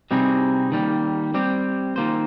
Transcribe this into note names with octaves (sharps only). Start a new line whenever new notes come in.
C3 G3 C4 D#4 G#4
D#3 G3 A#3
G3 C4 G4
D#3 A#3 F4 C5